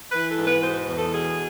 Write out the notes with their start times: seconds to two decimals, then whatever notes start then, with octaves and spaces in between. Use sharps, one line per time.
0.12 E3 B4
0.29 A4
0.38 G#2
0.46 B4
0.63 B2 C5
0.88 E2
0.97 A4
1.13 B2 G#4